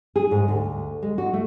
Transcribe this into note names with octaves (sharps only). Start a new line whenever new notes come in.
G#4
G#2
D2
G#3
F#4
A3